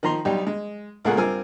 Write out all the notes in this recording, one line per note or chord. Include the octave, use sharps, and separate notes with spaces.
D#3 F3 A#5 C6
B1 G3 D#4 G4
G#3
C#2 A#2 A3 G#4 A#4 F#5
G2 C4 F4 A#4 G#5 E6